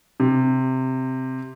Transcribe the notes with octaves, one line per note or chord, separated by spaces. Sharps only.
C3